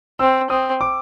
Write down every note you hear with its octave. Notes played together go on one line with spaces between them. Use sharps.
C4 E6
C4 D#6
D6